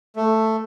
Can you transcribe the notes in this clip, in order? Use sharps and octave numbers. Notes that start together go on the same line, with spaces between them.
A3